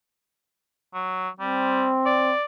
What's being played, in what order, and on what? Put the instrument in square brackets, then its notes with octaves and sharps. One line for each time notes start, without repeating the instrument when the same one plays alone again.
[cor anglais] F#3
[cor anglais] G3 [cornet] C4
[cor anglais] D5